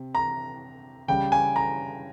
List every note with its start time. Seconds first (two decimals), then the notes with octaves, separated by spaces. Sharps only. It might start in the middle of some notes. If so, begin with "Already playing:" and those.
Already playing: C3
0.15 A#5
1.08 C#3 G3 G5
1.32 G#5
1.56 A#5